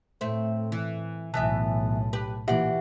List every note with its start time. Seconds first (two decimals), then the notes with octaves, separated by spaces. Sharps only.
0.21 A2 A3 C4
0.72 E3
1.34 B1 A2 E3 B3 E5 A5
2.13 G4 B4
2.48 A#2 E3 G4 D5 E5 F#5